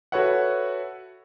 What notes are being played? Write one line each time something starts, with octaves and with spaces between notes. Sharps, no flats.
F#4 A4 B4 C#5 E5 F#5